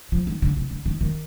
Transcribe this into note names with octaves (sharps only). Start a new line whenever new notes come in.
F3
D#3
D3
C3
D3
D#3
D#3